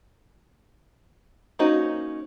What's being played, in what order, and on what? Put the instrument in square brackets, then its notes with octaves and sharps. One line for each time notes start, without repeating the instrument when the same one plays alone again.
[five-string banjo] A#3 C#4 D#4 F#4 C5